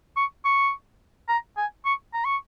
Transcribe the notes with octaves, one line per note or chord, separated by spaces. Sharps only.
C#6
C#6
A#5
G#5
C#6
A#5
C#6